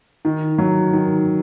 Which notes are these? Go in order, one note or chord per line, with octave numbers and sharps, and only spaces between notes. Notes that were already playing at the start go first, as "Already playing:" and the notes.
D#3
F#3
D#3